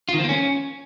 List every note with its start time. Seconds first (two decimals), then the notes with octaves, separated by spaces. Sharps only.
0.09 F4
0.14 D#3
0.19 F3
0.24 A#3
0.29 C#4